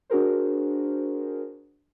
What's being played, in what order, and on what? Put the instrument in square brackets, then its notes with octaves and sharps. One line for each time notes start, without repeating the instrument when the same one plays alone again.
[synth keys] D4 F#4 G#4 A#4 C5